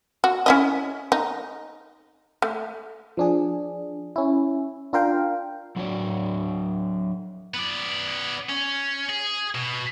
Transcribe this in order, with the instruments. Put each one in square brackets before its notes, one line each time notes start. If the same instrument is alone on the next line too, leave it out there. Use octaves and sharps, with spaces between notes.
[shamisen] F#4
C#4 E4 D#5
D#4
A3
[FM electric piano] F3 D4 G#4
C#4 E4
D4 F4 A#4 F5 G5
[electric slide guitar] F#3 D4 F#4 C#5 D5
[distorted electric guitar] B3 D5
C#4
G#4
B2